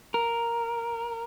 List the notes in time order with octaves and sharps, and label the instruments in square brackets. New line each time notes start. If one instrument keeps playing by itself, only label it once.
[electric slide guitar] A#4